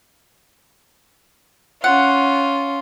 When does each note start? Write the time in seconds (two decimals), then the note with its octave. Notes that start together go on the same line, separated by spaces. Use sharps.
1.84 C#4 F4 F#5